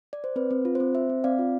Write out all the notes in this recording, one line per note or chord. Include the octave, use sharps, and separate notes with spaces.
D5
C5
C4 B4
C4
F4
C4 C5
C4 C5 E5
C4
C4 D5 F5
F4